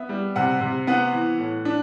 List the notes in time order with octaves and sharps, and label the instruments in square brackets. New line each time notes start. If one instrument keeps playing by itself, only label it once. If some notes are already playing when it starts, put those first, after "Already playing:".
Already playing: [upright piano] B3 E5
G3
C3 F#5
C3
B3 F#5
E3
A2
D4